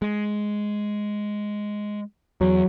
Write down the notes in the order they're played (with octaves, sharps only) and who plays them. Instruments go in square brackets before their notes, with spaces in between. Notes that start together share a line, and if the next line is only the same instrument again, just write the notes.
[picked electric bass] G#3
[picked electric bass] E2 [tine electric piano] F#3